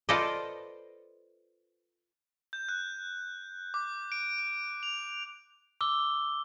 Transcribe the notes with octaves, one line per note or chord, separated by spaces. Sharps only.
F4 A4 B4 C5 D5 D#5
G6
F#6
D6
D7
D7
F7
D6 E6 G7